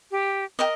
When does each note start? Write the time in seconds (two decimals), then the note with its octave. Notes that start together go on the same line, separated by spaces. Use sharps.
0.11 G4
0.59 G4 A#4 D#5